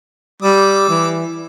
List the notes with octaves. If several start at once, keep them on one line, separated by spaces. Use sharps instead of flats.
G3 D6 E6
E3